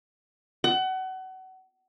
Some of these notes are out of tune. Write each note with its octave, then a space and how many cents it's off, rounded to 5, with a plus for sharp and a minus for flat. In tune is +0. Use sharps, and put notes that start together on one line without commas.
F#5 +30